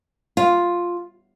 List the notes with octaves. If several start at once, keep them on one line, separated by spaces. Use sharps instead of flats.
F4